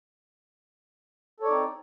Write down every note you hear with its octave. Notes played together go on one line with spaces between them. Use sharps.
C4 D#4 A4 C#5 D5